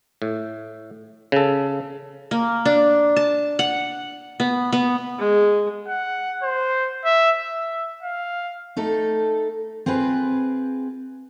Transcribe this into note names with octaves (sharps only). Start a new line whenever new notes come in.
A2
C#3 A4
A#3
D4
A5
F#5
B3
B3
G#3
F#5
C5
E5
E5
F5
A3 D#4 A4
C4 F4 G#4 B4